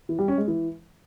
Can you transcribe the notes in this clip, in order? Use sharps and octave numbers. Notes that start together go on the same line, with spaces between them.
E3
G3
C#4
G#3
E3